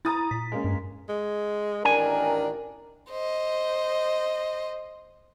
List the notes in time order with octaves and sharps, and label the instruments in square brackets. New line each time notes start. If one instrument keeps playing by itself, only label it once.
[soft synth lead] E4 [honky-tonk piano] A#5 D#6 A6
[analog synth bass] A#2 [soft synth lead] B6
[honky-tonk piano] G#3 A#3 C#4
[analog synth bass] G2
[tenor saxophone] G#3
[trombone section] A1 D#3 A#4 [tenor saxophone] D4 [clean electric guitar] G#5
[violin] C5 D#5